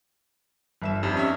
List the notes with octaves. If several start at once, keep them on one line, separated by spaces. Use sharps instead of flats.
G1 E5 E7
F2 G3 D#4
C#4 E5